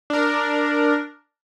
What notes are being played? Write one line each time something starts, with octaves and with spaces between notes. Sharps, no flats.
D4 A#4